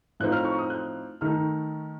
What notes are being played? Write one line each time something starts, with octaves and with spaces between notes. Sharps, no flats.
A2 F3 C4 D#4 F#6
F6
C#6
D#6
F#6
D#3 A3 D#4 F6